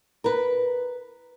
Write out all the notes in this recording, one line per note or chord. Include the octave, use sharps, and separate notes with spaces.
A#4 B4